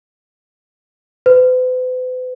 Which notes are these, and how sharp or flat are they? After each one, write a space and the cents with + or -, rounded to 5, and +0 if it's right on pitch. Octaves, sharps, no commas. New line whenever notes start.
B4 +45